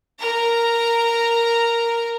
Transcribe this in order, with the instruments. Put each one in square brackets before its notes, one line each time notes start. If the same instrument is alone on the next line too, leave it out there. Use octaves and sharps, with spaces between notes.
[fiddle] A#4 A#5